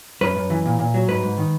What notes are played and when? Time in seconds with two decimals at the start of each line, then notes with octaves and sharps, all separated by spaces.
0.21 F#2 B4
0.36 F#2
0.50 E3
0.66 A#2
0.79 A#2
0.94 F#3
1.08 G#2 B4
1.23 G#2
1.38 D#3